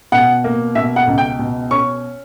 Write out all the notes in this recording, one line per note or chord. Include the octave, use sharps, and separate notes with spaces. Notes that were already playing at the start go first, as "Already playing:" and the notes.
B2 F#5
A#3
B2 E5
F#5
C#2
G5
B2
C#4 C#6